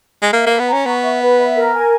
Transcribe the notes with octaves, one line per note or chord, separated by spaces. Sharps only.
G#3
A#3 E5
A#3 B4
B3
C#4 A#5
B3 C#6
E5
B4
E5
A#4
G#5